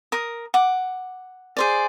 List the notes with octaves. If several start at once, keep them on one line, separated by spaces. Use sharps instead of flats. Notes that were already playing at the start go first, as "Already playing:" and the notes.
A#4 D#6
F#5 D6
G#4 C5 D5